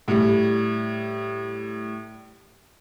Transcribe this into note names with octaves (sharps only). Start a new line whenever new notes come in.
A2 G3